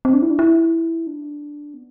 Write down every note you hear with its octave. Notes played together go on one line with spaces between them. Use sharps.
C4
D4
E4
D4
E4
D4
B3